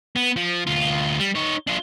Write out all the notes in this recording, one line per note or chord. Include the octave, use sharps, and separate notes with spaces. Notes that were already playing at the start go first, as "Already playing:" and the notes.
B3
F3
D2 F4
G3
D#4 C#5
D4 F4